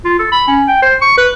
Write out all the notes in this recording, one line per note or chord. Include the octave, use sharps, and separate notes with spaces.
F4
A4
B5
C#4
G5
C5
C#6
B4